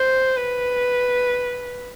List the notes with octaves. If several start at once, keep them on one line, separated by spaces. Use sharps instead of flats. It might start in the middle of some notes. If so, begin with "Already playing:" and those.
Already playing: C5
B4